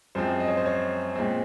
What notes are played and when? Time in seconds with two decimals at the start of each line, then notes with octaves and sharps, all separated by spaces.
0.15 F#2 F3 G#3 C4 C5
0.40 D#5
0.48 C#5
0.57 C5
0.66 C#5
1.15 A#2 G#3 C4